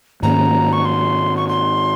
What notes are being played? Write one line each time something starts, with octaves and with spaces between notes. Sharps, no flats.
G#2 D#3 A#3 C#4 A#5
C#6
C6
C#6
C6